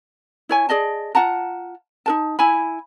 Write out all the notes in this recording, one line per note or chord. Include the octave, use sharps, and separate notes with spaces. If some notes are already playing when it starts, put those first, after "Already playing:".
E4 C#5 G#5
G#4 D5 D#5 A5
F4 F#5 A5 A#5
D#4 A#4 A5
E4 G#5 B5